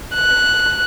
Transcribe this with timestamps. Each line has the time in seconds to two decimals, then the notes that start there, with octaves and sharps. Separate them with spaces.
0.15 F#6